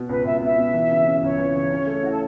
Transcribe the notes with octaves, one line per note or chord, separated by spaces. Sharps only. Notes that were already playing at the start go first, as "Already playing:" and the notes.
Already playing: B2 B3
C#2 B4
C#2 E5
B3 E5
B2
E3
C#3
C#4
C#2 C#5
E3
C#3
C#4
A3
E4 F#4
A4